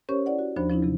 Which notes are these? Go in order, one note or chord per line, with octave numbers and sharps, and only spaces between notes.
C#4 G4 A#4 C5 C#5 C#6
E4 D5 F#5
F#4
D#2 F3 D4 C5 B5
F3 C#4 D#4 E4
C3 E3 F#3